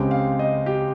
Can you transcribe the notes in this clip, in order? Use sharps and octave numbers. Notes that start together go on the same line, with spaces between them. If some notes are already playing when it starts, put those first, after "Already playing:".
Already playing: C#2 C#3 G#3 C4 G4
F5
D#5
G4